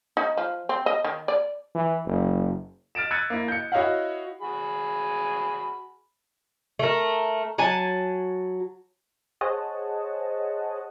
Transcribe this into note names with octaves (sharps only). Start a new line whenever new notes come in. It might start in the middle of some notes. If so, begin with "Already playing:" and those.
D#4
F3
C4
D#5
D#3
D5
E3
F#1
F6 A6 D7 E7
E6 F#6 G#6 A6 C#7 D#7
A#3 E4
G6 C#7
E4 F#4 C#5 D#5 F5 F#5
F#4 G#4 B5
A3 A#4
F#3 G#5 A5
G#4 C5 C#5 D#5 F#5 A5